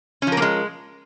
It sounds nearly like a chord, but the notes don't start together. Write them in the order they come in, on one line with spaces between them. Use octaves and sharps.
C#4 F3 A#4 A#3 G#3